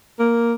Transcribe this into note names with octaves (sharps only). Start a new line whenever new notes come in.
A#3